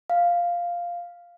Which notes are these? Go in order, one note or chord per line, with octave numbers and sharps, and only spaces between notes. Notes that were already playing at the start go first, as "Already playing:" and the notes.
F5